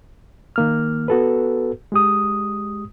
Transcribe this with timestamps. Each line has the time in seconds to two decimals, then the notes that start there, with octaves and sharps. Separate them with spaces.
0.56 D#3 A#3 F6
1.08 B3 F#4 A4 B4
1.92 G#3 G4 D#6